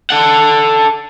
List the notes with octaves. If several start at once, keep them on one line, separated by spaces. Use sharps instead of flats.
A4 F#5